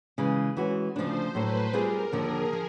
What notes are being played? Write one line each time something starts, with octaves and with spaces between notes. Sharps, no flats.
C#3 E3 G#3
E3 G#3 C#4 F#4
D2 C#3 F3 A3 D4 C5
A2 F#3 A3 B4
G3 C4 F4 G#4 A#4
D#2 D3 F3 G#4
F3